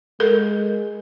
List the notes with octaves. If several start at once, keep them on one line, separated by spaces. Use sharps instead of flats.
G#3 A4 A#4